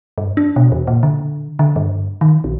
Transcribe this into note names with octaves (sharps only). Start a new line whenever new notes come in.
G2
D4
B2
E2
A#2
D3
D3
G2
D#3
A#1